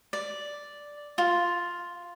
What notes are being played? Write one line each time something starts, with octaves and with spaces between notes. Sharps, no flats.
D5
F4